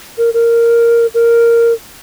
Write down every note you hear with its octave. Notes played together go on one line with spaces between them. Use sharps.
A#4
A#4
A#4